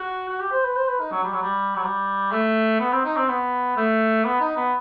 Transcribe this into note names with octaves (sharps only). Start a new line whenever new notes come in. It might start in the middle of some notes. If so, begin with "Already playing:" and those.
Already playing: F#4
F#4
G4
C5
B4
C5
B4
D#4
F#3
G3
F#3
G3
F#3
G3
A3
B3
C4
D#4
C4
B3
A3
B3
D#4
B3